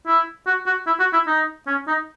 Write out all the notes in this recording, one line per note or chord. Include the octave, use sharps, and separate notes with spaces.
E4
F#4
F#4
E4
F#4
E4
D#4
C#4
D#4